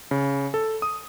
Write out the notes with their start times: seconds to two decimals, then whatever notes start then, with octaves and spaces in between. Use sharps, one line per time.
0.11 C#3
0.54 A4
0.82 D#6